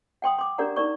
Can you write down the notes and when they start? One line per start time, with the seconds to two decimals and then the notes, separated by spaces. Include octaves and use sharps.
0.22 F#5 G5 C6 D#6
0.38 C6 D6
0.58 D4 G4 A#4 D5 F#5 A#5
0.76 D#4 A#4 D5 C#6